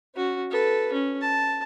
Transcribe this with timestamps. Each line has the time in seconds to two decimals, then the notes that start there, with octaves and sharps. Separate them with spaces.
0.15 C#4 F#4
0.50 A4 B4
0.93 C#4
1.21 A5